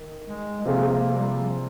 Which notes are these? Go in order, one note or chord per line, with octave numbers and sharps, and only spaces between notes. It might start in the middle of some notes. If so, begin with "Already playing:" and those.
Already playing: D#3
G#3
G#3
C3 F3 A#3 C4 F4 G#4
A#3
G3
F3